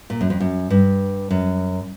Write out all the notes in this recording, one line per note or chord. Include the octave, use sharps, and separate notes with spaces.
A#2
F#2
F2
F#2
G2
F#2